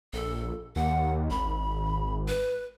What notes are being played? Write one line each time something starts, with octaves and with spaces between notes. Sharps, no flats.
A#1 A4
D#2 F#5
G#1 B5
B4